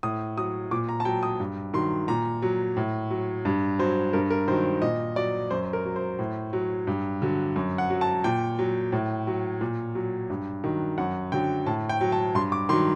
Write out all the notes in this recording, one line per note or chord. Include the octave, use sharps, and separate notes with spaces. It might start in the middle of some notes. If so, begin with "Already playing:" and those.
A2 D#6
F#3 D#6
A#2 D6
A#5
A5
F#3 G5
D#6
G2
D#3 F#3 C6
A#2 A#5
F#3
A2
F#3
G2
F#3 C5
G2 A#4
A#4
D#3 F#3 C5
A#2 D#5
F#3 D5
F#2 C5
A#4
F#3
C5
A2
F#3
G2
D3 F#3
F#2
F#5
F#3
A5
A#2 G5
F#3
A2
F#3
A#2
F#3
G2
D#3 F#3
F#2 F#5
D3 F#3 G5
A2 A5
G5
F#3
A5
G2 C6
D6
D#3 F#3 C6